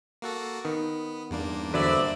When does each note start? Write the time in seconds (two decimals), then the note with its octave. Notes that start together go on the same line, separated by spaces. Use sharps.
0.22 A#3 F#4 A4
0.65 D#3 B3
1.31 E2 G2 A#3 D4
1.74 D3 F#3 B4 C5 D5 E5